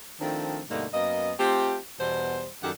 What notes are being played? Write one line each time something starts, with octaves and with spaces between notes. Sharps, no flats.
D#3 F3 A3 C4 D4
G2 B2 D3 A3 A#3 D#4
F#2 A#3 B3 D#5
A3 C4 F4 G4
E2 B2 G3 C5
F#2 D#3 G3 G4 A4 F#5